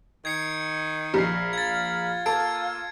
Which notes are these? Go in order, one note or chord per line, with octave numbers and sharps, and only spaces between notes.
D#3 G#6 C7 C#7
A#1 A#4 F5 B5 C7
F4 G#6 A6
A#3 A4 E6 G#6 C7 D7